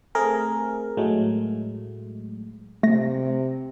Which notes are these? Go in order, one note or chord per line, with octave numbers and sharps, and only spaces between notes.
A3 C4 G#4 A#4
A2 F#3 G#3 A3
C3 A3 A#6